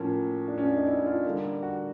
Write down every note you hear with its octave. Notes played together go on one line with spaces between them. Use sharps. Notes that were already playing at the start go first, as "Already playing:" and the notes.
Already playing: A2 F3 A#3 C#4
D4
C#4
D4
D#4
E4
F4
D3 G3 A#3
F#4